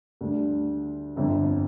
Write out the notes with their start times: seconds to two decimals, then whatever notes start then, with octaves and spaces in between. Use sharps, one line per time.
0.21 D2 D3 G3 D4
1.16 G1 F2 D3